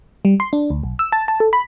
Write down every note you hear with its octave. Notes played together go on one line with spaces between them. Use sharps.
G3
C6
D4
D2
B1
E6
A5
A5
A4
B5